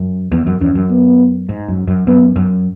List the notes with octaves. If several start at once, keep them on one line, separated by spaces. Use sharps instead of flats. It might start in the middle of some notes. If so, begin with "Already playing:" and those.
Already playing: F#2
E2 B3
F#2
E2 C#4
F#2
B3
G#2
F#2
F#2
F#2 B3
F#2